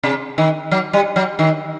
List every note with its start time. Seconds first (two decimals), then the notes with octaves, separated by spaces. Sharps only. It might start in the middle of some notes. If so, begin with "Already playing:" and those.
0.03 C3
0.38 D#3
0.71 F#3
0.93 G3
1.16 F#3
1.39 D#3